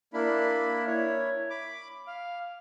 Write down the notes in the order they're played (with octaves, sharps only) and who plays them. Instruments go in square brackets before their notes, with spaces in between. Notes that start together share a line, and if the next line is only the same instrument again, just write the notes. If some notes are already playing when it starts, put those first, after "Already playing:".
[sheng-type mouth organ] A#3 D4 E4 B5
E4 C#5
B5 D6
F5